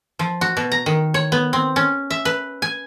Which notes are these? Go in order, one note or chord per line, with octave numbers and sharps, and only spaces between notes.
F3
F#4
B2
A#5
D#3
C#5
B3
C4
C#4
E5
B4
G#5